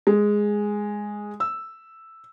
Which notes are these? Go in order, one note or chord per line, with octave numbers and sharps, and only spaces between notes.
G#3
E6